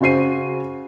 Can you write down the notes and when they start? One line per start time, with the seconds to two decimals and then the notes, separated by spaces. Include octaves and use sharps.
0.01 C#3 F#4 C5 C7 D#7